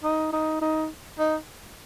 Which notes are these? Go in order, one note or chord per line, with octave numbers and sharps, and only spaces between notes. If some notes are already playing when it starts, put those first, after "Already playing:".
D#4
D#4
D#4
D#4